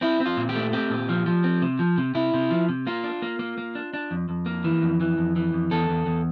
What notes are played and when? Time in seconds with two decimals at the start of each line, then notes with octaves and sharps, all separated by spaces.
0.01 C4 E4
0.20 C4
0.26 F4
0.37 A#2
0.49 G4
0.55 A3
0.73 C4 G4
0.90 A#2
1.09 F3
1.26 F3
1.44 C4
1.62 C3
1.79 F3
1.98 C3
2.15 C3 E4
2.34 C3
2.50 F3
2.69 C3
2.87 A#3 F4
3.04 D4
3.22 A#3
3.39 A#3
3.58 A#3
3.75 D4
3.93 D4
4.11 F2
4.29 F2
4.46 A#3
4.64 E3
4.82 F2
5.00 E3
5.18 F2
5.36 E3
5.53 F2
5.71 E2 A4
5.89 E2
6.06 E2